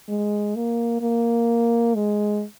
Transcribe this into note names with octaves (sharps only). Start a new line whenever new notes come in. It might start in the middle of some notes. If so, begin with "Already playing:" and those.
G#3
A#3
A#3
G#3